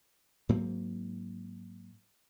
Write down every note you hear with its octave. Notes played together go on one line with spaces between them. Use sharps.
G#2 F#3 A#3 C4